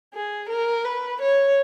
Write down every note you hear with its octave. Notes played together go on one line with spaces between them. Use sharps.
G#4
A#4
B4
C#5